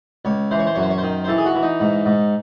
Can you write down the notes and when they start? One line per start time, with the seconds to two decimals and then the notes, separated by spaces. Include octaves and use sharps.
0.25 C#2 C#5
0.51 E3 C5
0.59 C#5
0.67 C5
0.75 F#2 C#5
0.83 C5
0.90 C#5
0.98 D#3 C5
1.24 C5
1.28 E3 A4
1.38 G#4
1.45 F#4
1.54 E3
1.62 D#4
1.80 G#2
2.05 G#2